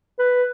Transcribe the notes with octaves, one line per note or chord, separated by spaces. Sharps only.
B4